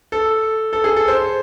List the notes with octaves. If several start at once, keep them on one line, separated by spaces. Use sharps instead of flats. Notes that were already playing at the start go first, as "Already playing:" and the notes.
A4
A4
G#4
A4
C5